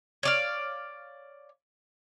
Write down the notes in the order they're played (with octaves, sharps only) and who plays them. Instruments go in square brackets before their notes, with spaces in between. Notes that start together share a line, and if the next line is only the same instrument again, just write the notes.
[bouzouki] C#5 D5 F5